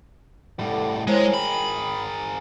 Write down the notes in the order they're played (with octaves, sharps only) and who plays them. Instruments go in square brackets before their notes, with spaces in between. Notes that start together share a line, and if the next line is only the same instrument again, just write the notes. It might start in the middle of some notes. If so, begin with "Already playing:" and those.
[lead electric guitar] A2 G3 [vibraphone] A4 F#5 D6
[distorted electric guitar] G#3 [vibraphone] E4 C5 C#5 [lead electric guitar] G#4 A#4
[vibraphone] G5 [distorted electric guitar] B5